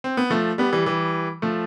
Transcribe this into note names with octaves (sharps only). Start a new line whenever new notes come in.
C4
B3
F3 A3
G3 B3
E3 G3
E3 G3
F3 A3